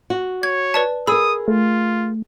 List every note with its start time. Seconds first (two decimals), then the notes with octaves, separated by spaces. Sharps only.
0.10 F#4
0.43 C#5 G#6
0.74 B4 D5 A5
1.07 G#4 A#4 B5 D#6 E6
1.48 A3 F4